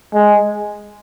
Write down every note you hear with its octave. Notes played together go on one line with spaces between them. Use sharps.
G#3